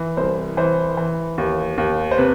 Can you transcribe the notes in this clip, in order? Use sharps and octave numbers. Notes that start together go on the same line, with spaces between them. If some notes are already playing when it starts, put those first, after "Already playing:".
Already playing: E3
C2 C5
E3 C5
E3
D#2
D#2
C5
C3 B4